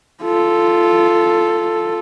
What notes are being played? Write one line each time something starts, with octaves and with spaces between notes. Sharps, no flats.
F4 A4